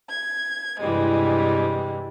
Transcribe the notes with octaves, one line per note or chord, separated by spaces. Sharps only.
G#6
G2 C3 E3 G3 G#3